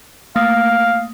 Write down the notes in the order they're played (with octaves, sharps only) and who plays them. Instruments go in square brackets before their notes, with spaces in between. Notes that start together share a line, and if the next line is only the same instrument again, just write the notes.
[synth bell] A3 A#3 D#6 [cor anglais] F5